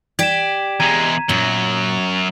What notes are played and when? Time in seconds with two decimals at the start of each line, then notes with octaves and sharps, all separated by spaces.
0.19 G4 D5 G#6 B6 E7
0.80 E2 G#3 A#5 G#6 D#7
1.29 F#2 A#2 F#3